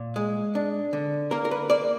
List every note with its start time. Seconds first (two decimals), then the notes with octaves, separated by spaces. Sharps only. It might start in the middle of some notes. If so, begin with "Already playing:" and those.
Already playing: A#2
0.16 G#3
0.55 D4
0.93 D3
1.31 A#3 A#4
1.45 A#4
1.51 B4
1.70 A#3 D5